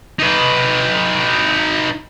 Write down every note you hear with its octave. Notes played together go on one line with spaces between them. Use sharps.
D#4 B4